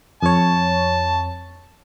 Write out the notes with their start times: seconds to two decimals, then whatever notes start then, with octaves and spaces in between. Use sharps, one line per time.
0.23 F2 C#5 A5